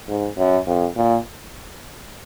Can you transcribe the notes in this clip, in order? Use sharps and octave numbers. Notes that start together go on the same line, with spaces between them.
G#2
F#2
F2
A#2